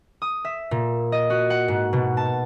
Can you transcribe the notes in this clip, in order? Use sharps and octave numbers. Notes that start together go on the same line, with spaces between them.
D#6
E5
A#2
D#5
F#4
F#5
G#2
B2
A5